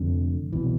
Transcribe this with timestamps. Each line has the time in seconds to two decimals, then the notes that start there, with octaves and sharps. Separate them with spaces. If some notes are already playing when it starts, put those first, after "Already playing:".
Already playing: F1 F2 D3
0.53 C2 B2 E3